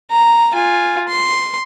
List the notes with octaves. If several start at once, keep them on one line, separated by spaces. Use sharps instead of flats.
A#5
F4 G#5
C6